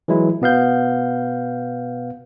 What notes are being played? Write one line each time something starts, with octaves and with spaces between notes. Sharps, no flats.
E3 F#3 G#3 E4
B2 B3 F5 G6